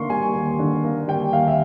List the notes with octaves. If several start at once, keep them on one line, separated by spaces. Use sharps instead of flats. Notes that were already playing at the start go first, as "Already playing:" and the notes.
Already playing: D3 A#3 C6 C#6
G3 G#5
D#2
D3
A#3
G3 G5
D#2 F5
E5